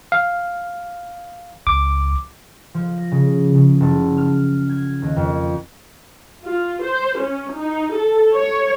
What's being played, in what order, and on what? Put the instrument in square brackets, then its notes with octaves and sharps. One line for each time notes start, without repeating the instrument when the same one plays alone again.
[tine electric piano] F5
[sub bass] C#2 [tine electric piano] D6
[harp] F3
A#6
C#3
C#3
F#1
F6
G#6
D#2
F2
[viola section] F4
C5
C#4
D#4
A4
C#5